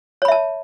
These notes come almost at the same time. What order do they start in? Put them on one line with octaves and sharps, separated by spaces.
C#5 B5 E5 A5